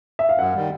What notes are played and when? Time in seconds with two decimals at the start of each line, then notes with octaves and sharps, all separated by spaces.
0.19 E5
0.29 F5
0.38 F#2 F#5
0.55 D#3 G3